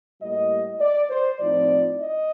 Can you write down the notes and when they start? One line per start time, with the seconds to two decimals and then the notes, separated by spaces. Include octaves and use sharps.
0.21 A2 G3 A#3 D#5
0.80 D5
1.10 C5
1.39 A2 F3 C4 D#4 D5
1.99 D#5